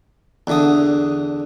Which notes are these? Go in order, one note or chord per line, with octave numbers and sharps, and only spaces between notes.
E2 D3 D#6